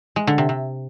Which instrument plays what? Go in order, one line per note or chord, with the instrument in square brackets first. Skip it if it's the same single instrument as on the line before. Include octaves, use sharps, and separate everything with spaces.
[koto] G#3
D3
C3
C3